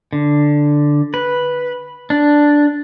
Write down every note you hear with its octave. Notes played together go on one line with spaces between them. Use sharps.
D3
B4
D4